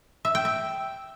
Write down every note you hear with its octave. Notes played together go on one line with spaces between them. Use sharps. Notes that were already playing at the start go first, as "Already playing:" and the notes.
E5
G5
E5